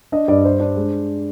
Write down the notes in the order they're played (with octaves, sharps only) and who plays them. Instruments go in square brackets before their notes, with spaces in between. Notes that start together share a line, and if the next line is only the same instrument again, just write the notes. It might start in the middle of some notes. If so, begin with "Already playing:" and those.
[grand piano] D4 D#5
G2 D5
G3 C5
D4
G#3